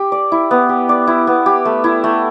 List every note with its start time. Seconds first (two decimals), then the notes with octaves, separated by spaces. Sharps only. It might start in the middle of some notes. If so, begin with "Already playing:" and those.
Already playing: G4
0.12 D5
0.32 E4
0.51 B3
0.69 G4
0.89 D5
1.07 E4
1.27 B3
1.46 G4
1.65 A3
1.84 E4
2.04 A3